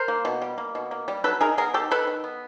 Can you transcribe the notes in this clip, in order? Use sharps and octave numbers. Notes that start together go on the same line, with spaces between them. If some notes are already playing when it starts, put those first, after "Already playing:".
Already playing: A#4 C5
A#3
B2
G3
A#3
B2
A#3
G3
F#3 A4 B4
D#3 G#4 A#4
B3 G#4 A#4
D#3 G4 A4
D#3 A4 B4
D#3
B3